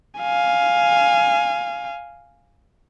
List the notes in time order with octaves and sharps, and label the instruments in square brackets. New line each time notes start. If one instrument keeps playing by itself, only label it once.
[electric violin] F5 G#5